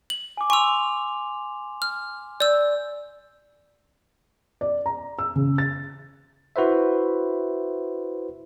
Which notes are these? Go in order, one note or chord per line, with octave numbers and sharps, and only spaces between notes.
F#7
G#5 D6
G#5 C6 C#6 E6 F7
F6
D5 E6 G6
D5
A#5
E6
C#3
A6
E4 F#4 B4 C5 E5